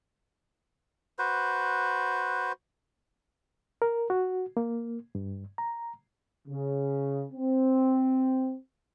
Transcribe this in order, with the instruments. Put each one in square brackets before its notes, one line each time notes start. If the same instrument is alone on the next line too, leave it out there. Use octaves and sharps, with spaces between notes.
[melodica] F#4 B4 C5
[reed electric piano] A#4
F#4
A#3
G2
A#5
[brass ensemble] C#3
C4